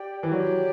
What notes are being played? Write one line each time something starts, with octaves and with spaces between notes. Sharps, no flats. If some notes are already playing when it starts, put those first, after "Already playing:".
Already playing: G4 D5 G5
E3
F#3 G4 D5 G5